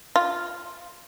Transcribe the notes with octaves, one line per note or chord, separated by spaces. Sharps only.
F4